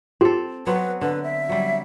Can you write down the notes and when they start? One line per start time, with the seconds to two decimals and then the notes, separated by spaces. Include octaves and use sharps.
0.21 C4 F4 G4 A4
0.67 F#3 B3 C4 B4
1.01 D3 B4
1.23 E5
1.49 F#3 G3